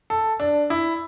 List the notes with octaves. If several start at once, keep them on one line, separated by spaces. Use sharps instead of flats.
A4
D4
E4